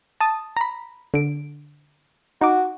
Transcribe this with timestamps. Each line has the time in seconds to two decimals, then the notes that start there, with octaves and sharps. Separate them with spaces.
0.21 A5 D#6
0.57 A#5 B5
1.14 D3 D7
2.41 D#4 F#4 D6